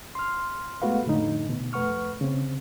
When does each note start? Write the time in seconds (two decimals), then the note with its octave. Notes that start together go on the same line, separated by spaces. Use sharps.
0.15 C6 F6
0.82 G#3 A3 B3 F#4 B4 F5
1.05 F2 A2 D3 A3 D#4
1.49 B2
1.73 F2 A3 B4 F#5 C#6 F6
2.21 C#3 C4